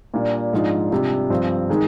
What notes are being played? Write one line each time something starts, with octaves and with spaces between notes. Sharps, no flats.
A#2 G3 D4 F4
G#2 F3 G#3 D4 F4
C3 G3 D4 F4
G2 F3 C4
D#3 G#3 D#4